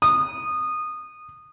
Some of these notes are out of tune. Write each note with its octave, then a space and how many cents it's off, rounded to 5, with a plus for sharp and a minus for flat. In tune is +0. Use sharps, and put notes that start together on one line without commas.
D#6 -20